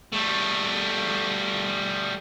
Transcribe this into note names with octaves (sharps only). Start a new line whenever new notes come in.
G3 A3